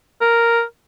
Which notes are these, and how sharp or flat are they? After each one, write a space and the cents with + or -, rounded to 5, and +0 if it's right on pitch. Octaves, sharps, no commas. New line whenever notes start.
A#4 +0